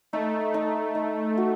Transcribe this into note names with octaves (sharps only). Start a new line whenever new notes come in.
A3 D#4
D#4
D#4
F#4